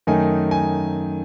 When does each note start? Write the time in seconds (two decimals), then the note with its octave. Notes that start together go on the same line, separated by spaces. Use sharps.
0.07 F#2 D#3 A3 D#4 G#5
0.51 G#5